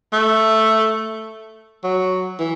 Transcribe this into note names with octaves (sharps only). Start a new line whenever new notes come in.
A3
F#3
E3